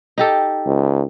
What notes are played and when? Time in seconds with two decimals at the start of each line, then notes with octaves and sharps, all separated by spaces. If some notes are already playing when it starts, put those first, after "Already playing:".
0.18 D#4 G4 A4
0.66 C#2